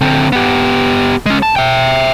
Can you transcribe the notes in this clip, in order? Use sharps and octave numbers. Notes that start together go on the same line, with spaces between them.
D3 C4
B3 G4
G#3 C#4
A5
E5 G5